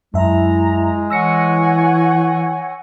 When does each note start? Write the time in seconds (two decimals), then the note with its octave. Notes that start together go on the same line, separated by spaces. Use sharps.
0.14 F#2 G#3 E4 E5 A#5
1.10 E3 C#5 F#5 G#5 E6 A#6 C#7